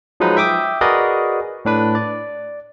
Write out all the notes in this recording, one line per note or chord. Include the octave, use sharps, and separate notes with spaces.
F3 F#3 G#3 D#4 B4
E5 G5 D6 D#6
F#4 G#4 A#4 B4 D5 D#5
A2 D4 B4
D5